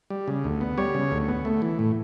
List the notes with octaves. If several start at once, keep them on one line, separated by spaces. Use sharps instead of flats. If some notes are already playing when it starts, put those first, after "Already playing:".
G3
C#3
D2
B3
G3 C#5
C#3
D2
B3
A3
E3
A2